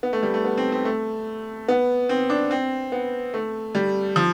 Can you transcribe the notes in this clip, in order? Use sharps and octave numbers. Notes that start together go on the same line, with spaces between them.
B3
A3
G3
A3
B3
C4
C4
A3
B3
C4
D4
C4
B3
A3
G3
F3